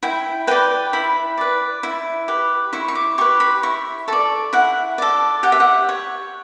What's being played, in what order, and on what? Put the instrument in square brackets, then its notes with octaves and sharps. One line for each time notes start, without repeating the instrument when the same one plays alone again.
[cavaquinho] E4 G5
B4 D5 G5
E4 B5
B4 D5
E4
G4 B4
E4 C#6
C#6
D6
G4 B4 C#6
B5
E4 C#6
A4 D5 C#6
E4 F#5
A4 D5
G4 F#5
E5
F#5
C#5